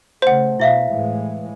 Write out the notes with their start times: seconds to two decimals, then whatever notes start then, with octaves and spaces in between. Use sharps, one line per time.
0.22 C#3 A3 C5 F#5 C6
0.60 B2 E4 E5 F5
0.89 A2 E3 G#3